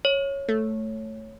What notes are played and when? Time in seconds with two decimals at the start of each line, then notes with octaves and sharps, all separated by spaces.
0.05 C#5
0.49 A3